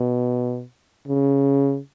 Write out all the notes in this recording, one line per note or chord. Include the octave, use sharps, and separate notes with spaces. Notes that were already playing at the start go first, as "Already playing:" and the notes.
Already playing: B2
C#3